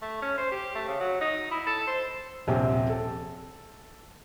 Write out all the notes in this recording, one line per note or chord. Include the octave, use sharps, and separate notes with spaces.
A3
C#4
C5
G4
A3
C#3
F#3
D#4
E4
A4
C5
D#1 A#1 C3 C4 G5
A4